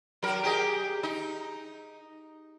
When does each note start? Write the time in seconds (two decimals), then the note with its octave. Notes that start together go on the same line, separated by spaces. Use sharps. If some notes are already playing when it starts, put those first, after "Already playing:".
0.23 F#3 A#4
0.43 G4 G#4 D#5
1.03 D#4